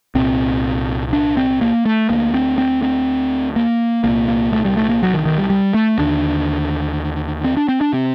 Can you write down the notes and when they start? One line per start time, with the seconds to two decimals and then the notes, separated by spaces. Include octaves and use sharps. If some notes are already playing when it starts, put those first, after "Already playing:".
0.15 C2 A#2 C4
1.13 D4
1.37 C4
1.61 A#3
1.86 A3
2.09 D2 D3 A#3
2.34 C4
2.58 C4
2.82 C4
3.56 A#3
4.04 C2 A#2 A#3
4.28 A#3
4.52 A3
4.65 G3
4.77 A3
4.89 A#3
5.03 F#3
5.14 D#3
5.26 D#3
5.37 G3
5.50 G3
5.74 A3
5.98 D#2 D3 D4
7.44 C4
7.57 D4
7.68 C4
7.81 D4
7.93 C3 C4